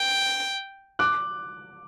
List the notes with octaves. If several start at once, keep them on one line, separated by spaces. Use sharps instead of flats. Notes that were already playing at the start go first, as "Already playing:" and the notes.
Already playing: G5
D6 F#6